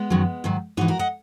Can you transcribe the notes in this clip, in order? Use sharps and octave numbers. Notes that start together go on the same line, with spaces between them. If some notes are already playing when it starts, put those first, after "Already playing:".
Already playing: G#3 B3
F#2 D#3 F#3
G#2 D#3 F#3
G#2 E3 D#4 F#4
F#4 A#4
D#5 F#5